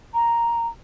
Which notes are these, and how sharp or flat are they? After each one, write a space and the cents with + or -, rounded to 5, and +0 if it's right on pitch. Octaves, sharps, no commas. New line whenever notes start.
A#5 +0